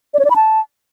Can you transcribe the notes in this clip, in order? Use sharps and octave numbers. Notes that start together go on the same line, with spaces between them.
D5
C#5
D5
B5
A5